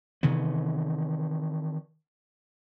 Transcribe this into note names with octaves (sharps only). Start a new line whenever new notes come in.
C3 D#3 E3 B3